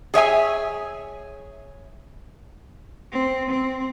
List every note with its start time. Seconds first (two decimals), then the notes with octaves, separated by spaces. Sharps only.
0.14 G#4 C#5 E5 G#5
3.12 C4
3.50 C4